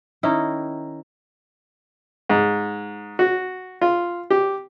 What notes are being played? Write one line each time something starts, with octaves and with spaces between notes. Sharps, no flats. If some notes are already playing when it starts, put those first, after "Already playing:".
D#3 C#4 D#4 E4
G#2
F#4
F4
G4